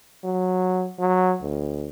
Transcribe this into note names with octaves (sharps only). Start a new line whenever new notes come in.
F#3
F#3
D2